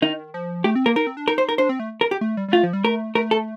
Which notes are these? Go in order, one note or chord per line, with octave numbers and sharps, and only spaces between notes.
D#3 D#4
F3
A3 G4
C4
A#3 A#4
D#4 A#4
C4
D4
D#4 A#4
C5
A#4
D4 C5
C4
A3
A#4
G4
A3
G3
G3
A3 F4
F3
G3
A3 A#4
A3 A#4
A4